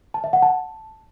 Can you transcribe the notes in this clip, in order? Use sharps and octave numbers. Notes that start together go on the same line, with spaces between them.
A5
E5
F#5
A5